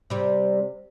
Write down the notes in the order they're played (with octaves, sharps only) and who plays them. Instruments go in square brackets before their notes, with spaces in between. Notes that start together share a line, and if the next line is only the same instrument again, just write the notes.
[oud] C3 G3